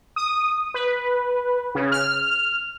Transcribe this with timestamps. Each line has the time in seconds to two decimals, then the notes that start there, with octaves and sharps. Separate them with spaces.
0.16 D#6
0.74 B4
1.75 C#3
1.92 F6